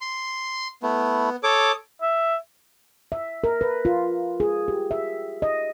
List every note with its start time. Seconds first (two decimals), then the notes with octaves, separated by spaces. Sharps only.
0.01 C6
0.83 A3 B3 E4
1.43 A4 C#5 D6 D#6
2.02 E5
3.12 E5
3.44 A#4
3.61 B4
3.85 F4
4.40 G#4
4.68 G4
4.91 E5
5.42 D#5